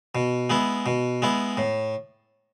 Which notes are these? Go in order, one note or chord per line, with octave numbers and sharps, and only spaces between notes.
B2
G#3 B3 E4
B2
G#3 B3 E4
A2